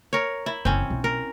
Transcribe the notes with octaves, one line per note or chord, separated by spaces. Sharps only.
A#4 C#5
E4
F#1 E3 C4 C#4
B1 B2
A#4